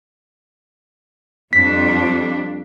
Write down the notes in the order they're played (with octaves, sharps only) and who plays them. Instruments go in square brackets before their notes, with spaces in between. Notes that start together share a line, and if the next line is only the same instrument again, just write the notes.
[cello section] F2 G3 D4 [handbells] B6